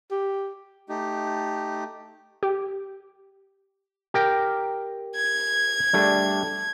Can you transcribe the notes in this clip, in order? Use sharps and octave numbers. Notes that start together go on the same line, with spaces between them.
G4
A3 D#4 G4
G4
G4 A#4 G5
G#6
G3 A3 D4